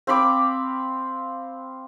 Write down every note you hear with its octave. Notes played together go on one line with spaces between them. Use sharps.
C4 F5 B5 D6